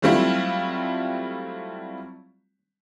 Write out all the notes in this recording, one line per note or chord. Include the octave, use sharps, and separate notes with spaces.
F#3 G3 A3 C4 E4 F4